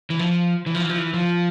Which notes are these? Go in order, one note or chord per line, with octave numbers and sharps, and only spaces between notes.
E3
F3
E3
F3
E3
F3
E3
F3